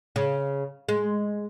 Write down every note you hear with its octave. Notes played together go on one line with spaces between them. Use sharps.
C#3
G#3